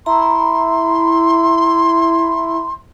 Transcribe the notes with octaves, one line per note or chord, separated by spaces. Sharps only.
E4 A#5 C6